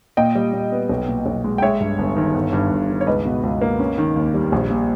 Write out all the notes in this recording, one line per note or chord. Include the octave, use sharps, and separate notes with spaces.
A#2 D#5 G5
G3
A#2
B3
B1
A#2
B1
G#3
G5
G#3 C#5 E5
G2
G1
D#3
G1
G2
G1
D#3
C#5
C#2 B4 D#5
B2
C#2
A#3
C#4
D#3
D#2
G3
A#1
A#2